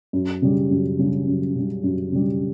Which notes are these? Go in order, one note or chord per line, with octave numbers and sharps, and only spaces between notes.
F#2
C#3 G3
F#2
C#3 G3
F#2
C#3 G3
F#2
C#3 G3